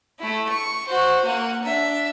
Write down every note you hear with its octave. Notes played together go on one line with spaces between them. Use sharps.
A3 E4
C#6
F#4 C5
A#3 F#5
D4 E5